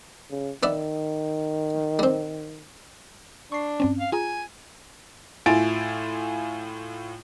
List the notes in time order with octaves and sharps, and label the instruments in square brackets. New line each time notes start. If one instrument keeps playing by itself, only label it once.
[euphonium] C#3
[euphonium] D#3 [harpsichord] B3 D5 E5
[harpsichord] G3 C4
[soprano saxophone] D4 [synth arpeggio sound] C#6 C7
[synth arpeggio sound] G2 C4 C#4
[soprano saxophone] F5
[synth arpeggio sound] F4 G#4 A#5 [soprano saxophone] G#5
[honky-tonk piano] A2 E4 F4 G#5 A6 D7